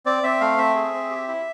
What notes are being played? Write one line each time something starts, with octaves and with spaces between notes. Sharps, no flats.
C4 D5
C4 E5
A3 F5
C4 E5
G#4
C4
G4
E4